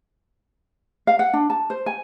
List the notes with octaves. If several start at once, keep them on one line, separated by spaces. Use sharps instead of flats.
F5
F#5
D4
A5
C5
G#5